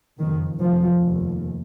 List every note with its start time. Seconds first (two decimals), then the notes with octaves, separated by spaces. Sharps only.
0.18 F#1 F2 D#3
0.60 F1 F2 F3
1.01 F1 D#2